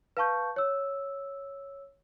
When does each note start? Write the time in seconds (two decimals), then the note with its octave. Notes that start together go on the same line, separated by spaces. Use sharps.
0.17 B4 F5 A5 C#6 G6
0.56 C#5 E6